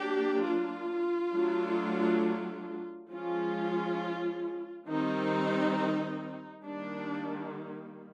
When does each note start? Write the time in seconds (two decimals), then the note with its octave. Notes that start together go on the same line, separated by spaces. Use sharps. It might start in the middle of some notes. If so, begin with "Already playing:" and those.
Already playing: F#3 A#3 D4 G4
0.45 F4
1.33 F#3 A3 D4
3.10 F3 G#3 C#4 F4
4.88 D#3 G3 C4 D#4
6.65 D#3 G3 A#3 D4